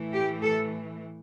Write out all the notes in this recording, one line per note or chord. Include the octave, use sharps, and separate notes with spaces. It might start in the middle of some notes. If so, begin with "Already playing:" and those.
Already playing: A2 E3 A3
G4
A4